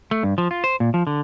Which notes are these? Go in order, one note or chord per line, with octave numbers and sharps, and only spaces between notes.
A3
G2
F3
F4
C5
A#2
F3
D3